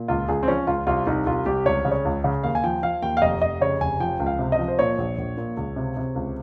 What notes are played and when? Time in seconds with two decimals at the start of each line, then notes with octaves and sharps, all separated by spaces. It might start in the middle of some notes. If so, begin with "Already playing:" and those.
Already playing: A#2
0.08 C#2 F4
0.28 C#2 G#4
0.43 C4
0.48 F3 C#4
0.67 C#2 F4
0.87 C2 F4
1.07 C2 D#4
1.26 C2 F4
1.46 C2 G4
1.65 C#2 C#5
1.85 C#3
1.91 C#5
2.05 C#2
2.24 C#3
2.43 D#2 F5
2.55 G#5
2.64 F3 G5
2.83 F3 F5
3.02 D#2 G5
3.17 F5
3.22 F1 D#5
3.41 F1 D#5
3.61 C#3 C#5
3.81 F1 G#5
4.00 F3 G5
4.20 C#2
4.27 F5
4.39 C3
4.52 D#5
4.59 F3
4.68 C5
4.79 A#2 C#5
4.98 A#1
5.18 A#1
5.37 A#2
5.57 C#2
5.76 C3
5.97 C3
6.16 C#2